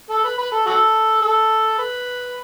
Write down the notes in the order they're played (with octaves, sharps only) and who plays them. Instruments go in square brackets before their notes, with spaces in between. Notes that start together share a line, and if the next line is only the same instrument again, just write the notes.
[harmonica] A4
B4
B4
A4
F#4 A4
A4
B4